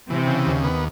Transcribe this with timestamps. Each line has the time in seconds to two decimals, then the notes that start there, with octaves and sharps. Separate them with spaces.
0.09 C3 E3 C4
0.27 C#3
0.47 D#2
0.64 B3